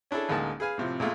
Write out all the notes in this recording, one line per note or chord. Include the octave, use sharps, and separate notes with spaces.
C#4 D4 E4 G#4 A4
A1 D2 G#3 A#3 D#4 A5
G#4 B4 F5 G#5
A2 C3 F3
A#2 G#3 A3 F4